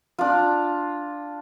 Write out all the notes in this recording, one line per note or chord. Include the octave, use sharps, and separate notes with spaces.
D4 F4